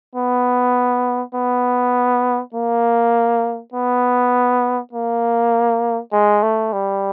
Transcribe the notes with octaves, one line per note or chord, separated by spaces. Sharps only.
B3
B3
A#3
B3
A#3
G#3
A3
G3